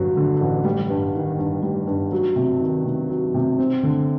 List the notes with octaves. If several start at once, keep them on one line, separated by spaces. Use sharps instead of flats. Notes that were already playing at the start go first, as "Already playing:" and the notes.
Already playing: A1 G2 D3 F#3
D3
A1
G3
G2
D#3
G2
G3
G2
F#3
C3
D#3
C3
F#3
C3
C4
D3